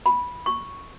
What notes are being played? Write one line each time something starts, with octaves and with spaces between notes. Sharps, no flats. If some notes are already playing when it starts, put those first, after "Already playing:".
B5
C#6